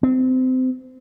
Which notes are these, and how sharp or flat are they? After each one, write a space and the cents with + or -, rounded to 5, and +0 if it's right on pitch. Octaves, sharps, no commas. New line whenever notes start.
C4 -25